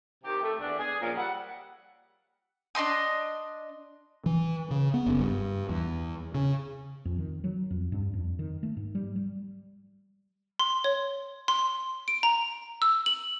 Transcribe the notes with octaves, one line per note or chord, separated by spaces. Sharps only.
C3 D#3 G4
A3
E2 D4
G#4
A#2 C#3 F3 A#3 D5
G3 E5 F#5
D4 D#5 C6 D#6
E3
C#3
B3
F#1
G2
E2
C#3
F2
D#3
F#3
F2
G2
F2
D#3
A3
G#2
G3
G3
C6
C#5
C6
D7
A#5
E6
F#7